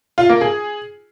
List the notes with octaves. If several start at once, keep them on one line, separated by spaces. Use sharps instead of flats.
F4
A#3
G#4